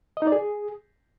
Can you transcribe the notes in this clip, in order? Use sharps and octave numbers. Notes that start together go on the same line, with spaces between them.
D#5
D#4
D5
G#4